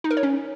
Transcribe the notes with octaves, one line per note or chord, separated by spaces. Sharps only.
D#4
A#4
C#5
C#4